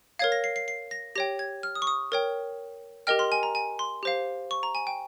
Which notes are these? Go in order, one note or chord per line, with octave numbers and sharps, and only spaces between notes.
A#4 C#5 F5 G#6
A#6
C7
C7
C7
A#6
G4 C#5 G5 A#6
G#6
F6
D#6
C#6
D#6
A#4 C#5 G5
G4 A#4 D#5 G5 F6
C6
G#5
A#5
G#5
C6
G4 C5 F5
C#6
A#5
G#5
G5